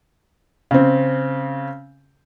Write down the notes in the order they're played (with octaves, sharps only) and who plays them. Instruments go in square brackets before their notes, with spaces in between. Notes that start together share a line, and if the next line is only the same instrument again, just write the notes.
[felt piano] C#3 C4